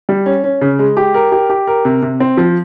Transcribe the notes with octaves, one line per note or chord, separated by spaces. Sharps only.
G3
C#4
C#4
C#3
G#3
G4
A#4
G4
G4
A#4
C3
C3
C4
F3